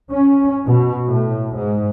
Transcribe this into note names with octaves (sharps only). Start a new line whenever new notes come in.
C#4
B2
A2
G#2